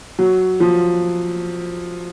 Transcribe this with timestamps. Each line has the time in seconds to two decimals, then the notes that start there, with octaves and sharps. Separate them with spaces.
0.19 F#3
0.60 F3